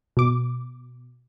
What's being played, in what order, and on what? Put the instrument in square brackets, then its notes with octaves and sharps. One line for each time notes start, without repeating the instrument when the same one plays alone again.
[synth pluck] B2 D6